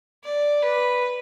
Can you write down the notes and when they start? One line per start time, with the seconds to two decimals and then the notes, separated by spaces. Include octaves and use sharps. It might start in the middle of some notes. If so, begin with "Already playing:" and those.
0.23 D5
0.62 B4